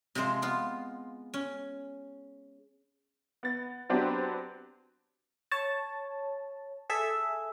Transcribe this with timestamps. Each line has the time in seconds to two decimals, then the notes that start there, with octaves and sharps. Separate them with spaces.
0.15 C3 F3 G#3 C5
0.42 B3 F4
1.34 C#4
3.43 B3 A6
3.89 F#3 B3 C4 D4 G4 B4
5.51 C#5 A5
6.90 G#4 A4 E5